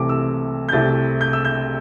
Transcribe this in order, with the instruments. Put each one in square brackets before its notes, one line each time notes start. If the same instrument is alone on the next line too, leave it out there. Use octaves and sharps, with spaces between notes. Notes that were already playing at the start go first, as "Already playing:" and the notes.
Already playing: [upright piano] C2 C3 E3 A3 C4 D6
E6
G6
C2 C3 A3 C4 E4 A6
G6
E6
G6